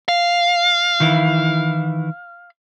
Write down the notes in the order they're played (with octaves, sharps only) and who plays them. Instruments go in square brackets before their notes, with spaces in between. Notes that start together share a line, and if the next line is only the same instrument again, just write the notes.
[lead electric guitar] F5
[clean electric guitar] D#3 E3 E4